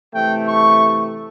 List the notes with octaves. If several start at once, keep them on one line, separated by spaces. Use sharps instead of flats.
C3 E3 A3 G5
C#6